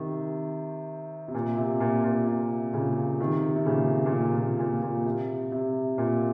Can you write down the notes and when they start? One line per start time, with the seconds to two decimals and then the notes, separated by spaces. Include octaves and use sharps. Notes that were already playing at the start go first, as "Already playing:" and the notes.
Already playing: C3 D#3
1.28 C3
1.34 A#2
1.57 C3
1.80 A#2
2.04 A#2
2.27 C3
2.74 A#2 C#3
3.20 C3 D#3
3.56 C3
3.66 A#2 C#3
4.06 A#2
4.12 C3
4.36 A#2
4.59 A#2
4.82 A#2
5.05 C3
5.52 C3
5.98 A#2